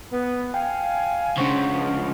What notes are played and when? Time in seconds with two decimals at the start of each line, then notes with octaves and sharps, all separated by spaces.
0.11 B3
0.54 F5 G5 G#5
1.38 C#2 C#3 D4 C5 F#5 C#6
1.73 F3